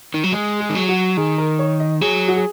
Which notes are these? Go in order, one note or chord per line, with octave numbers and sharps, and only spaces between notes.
D#3
F#3
G#3 G#4
G#4
D#3
F#3
F#4
D#3 G#4
A#4
C#5
D#5
F#3 G#4
F#4
G#4